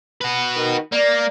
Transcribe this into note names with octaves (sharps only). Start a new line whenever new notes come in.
F#4 B4
D#3
A#3 D5